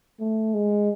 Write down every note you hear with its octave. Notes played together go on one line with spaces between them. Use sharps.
A3
G#3